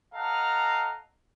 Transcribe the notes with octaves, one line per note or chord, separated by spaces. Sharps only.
A4 D#5 F5 F#5 A5 A#5